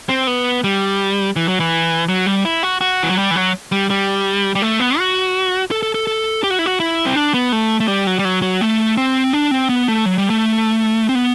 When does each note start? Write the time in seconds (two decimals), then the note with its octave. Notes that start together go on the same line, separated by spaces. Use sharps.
0.09 C4
0.27 B3
0.64 G3
1.36 E3
1.48 F#3
1.60 E3
2.08 F#3
2.26 G3
2.45 E4
2.63 F#4
2.81 F#4
3.03 E3
3.10 F#3
3.17 G3
3.31 E3
3.35 F#3
3.72 G3
3.90 G3
4.55 G3
4.62 A3
4.80 B3
4.98 F#4
5.71 A4
5.83 A4
5.94 A4
6.07 A4
6.44 G4
6.50 F#4
6.59 E4
6.66 F#4
6.80 E4
7.06 C4
7.16 D4
7.34 B3
7.52 A3
7.80 A3
7.88 G3
8.07 F#3
8.19 G3
8.25 F#3
8.42 F#3
8.61 A3
8.97 C4
9.33 D4
9.51 C4
9.69 B3
9.88 A3
10.06 F#3
10.18 G3
10.30 A3
11.09 C4
11.15 B3